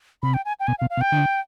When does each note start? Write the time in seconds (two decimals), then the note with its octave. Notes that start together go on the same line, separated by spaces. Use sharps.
0.23 C3 B5
0.34 G5
0.45 G#5
0.60 G5
0.67 B2 G#5
0.79 F5
0.82 B2
0.90 F5
0.97 B2
1.01 G5
1.12 D3